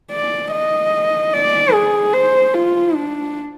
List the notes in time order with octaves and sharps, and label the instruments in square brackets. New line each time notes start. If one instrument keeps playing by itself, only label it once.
[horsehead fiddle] D5
D#5
D5
G#4
C5
F4
D4